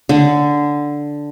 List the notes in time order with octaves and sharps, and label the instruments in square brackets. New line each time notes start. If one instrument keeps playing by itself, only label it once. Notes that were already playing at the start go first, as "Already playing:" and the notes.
[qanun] D3